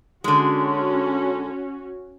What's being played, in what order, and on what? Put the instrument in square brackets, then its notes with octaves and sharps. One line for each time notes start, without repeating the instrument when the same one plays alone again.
[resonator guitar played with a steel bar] D3 G#3 [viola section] C#4 F#4